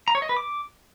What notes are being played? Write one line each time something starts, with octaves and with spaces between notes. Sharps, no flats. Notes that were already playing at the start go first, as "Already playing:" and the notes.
A#5
C#5
D#5
B4
D6